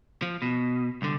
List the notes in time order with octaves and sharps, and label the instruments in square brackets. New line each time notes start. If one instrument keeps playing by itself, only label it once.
[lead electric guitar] F3
B2
C2 D3